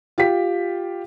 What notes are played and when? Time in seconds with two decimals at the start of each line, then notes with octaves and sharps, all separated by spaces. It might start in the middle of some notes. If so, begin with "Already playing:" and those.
0.18 F4 G4 G5 B6